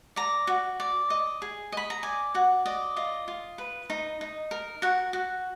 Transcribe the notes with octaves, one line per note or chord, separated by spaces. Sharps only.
D5 A#5
F#4
D5
D#5
G#4
D#5 B5
A#5
D5 G#5
F#4 F#5
D5 D#5
F4 D#5
F4
B4
D#4
D#4
A#4
F#4 F#5
F#4